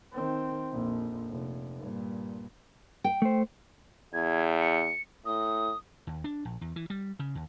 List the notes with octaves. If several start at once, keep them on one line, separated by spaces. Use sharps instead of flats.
D#3 C4
A#1 F2
F1
G2 A#2
G5
A3 C5
E2 G#6
C#7
A2 D#6
D#2
D4
A#1
E2
E3
G3
C#3
D#2